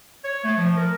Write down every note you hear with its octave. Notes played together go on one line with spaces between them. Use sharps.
C#5
A3
F3
A#4